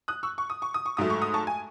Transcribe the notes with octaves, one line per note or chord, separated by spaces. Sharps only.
D#6 F#6
C#6 E6
C#6
D#6
C#6
D#6
C#6
G#2 F#3 A3 D#6
C#6
D#6
A5 C#6
G#5